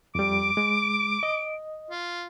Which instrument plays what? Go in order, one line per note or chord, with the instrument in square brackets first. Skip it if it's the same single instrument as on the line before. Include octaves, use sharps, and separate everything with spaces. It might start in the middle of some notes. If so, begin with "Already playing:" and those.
[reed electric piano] F2 G3 [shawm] D6 [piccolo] D7
[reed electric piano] G#3
D#5
[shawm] F4